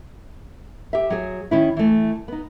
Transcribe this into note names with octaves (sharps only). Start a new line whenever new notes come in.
G4 E5
F#3 G#4
D#3 C#4 E4
E3 A3
B3 D#4